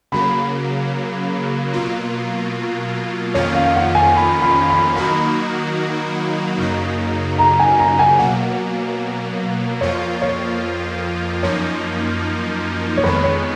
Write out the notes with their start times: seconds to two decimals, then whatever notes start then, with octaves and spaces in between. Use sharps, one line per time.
0.12 C#3 F#3 A#3 B5
1.73 B2 F#3 A#3 F4
3.34 F2 D#3 A#3 C#4 F4 C#5
3.54 F5
3.75 F#5
3.95 G#5
4.16 B5
4.42 B5
4.70 B5
4.97 D#3 F#3 A#3 D#4 F#4 B5
6.58 F#2 C#3 F#3 A#3 D#4
7.39 A#5
7.60 G#5
7.79 A#5
7.99 G#5
8.19 B2 F#3 A#3 F#5
9.81 F2 F3 A#3 F4 C#5
10.22 C#5
11.43 F#2 F3 A#3 D#4 C#5
12.97 C#5
13.04 F2 D#3 G#3 B3 B4
13.24 C#5